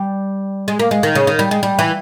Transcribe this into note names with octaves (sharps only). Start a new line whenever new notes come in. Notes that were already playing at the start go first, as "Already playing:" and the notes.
Already playing: G3
G#3
A#3
G#3
D#3
C#3
D#3
G3
G#3
G3
E3